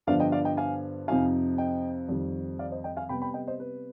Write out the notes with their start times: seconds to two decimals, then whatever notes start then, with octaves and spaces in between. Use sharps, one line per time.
0.07 G2 D3 F3 B3 D5 F5
0.20 D#5 G5
0.32 D5 F5
0.45 D#5 G5
0.57 F5 G#5
1.08 F2 C3 F3 C4 D#4 F5 G#5
1.58 D#5 G5
2.09 F2 D#3 G3
2.59 D5 F5
2.71 C5 D#5
2.84 D#5 G5
2.97 F5 G#5
3.09 C3 G3 B3 G5 B5
3.22 G5 B5
3.34 D#5 G5
3.47 C5 D#5
3.60 B4